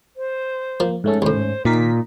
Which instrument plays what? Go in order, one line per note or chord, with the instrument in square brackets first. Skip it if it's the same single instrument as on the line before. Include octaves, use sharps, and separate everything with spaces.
[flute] C5
[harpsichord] F3 [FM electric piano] A#3
[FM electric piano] G#2 A3 C#4 [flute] A4
[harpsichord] D#2 A2 [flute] C5
[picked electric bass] A#2 [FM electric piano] D#3 A#4 B6 [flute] D#4